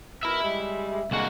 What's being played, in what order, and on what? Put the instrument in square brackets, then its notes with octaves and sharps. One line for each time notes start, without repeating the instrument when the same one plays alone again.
[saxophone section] B2 A#4 [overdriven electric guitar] E5 B5
[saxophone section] G3 G#3
[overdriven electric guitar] C2 F#4 [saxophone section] D3 G#3 A#3